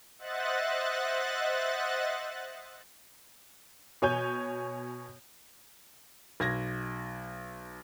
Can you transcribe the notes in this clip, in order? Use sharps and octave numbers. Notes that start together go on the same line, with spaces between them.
C5 D#5 E5 F#5 F#6 A6
B2 C#5 G#5 G6
B1 G#6 A#6